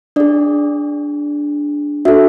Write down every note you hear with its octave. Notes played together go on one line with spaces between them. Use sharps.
D4 G#4 D5
D4 F#4 A4 E5